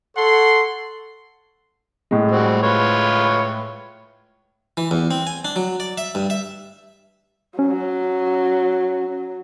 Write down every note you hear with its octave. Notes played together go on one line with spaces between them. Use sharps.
A4 C#5 F#5 C6
A2 G#3
G3 C4 F#4
F4 B4 C#5
E3
E2
C4
G#5
D4
F#3
D5
E5
G2
E5
F#3 C#4